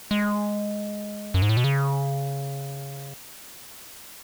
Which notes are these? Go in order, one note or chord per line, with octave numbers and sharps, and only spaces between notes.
G#3
F#2
G#2
A2
B2
C#3